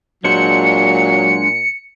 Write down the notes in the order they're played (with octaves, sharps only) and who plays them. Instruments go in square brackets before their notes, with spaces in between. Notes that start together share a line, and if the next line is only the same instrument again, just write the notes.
[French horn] A#2 [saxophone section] F#3 [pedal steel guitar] G#3 D4 C5 [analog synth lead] C#7